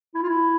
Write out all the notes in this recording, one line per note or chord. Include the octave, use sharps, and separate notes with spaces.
E4
F4
E4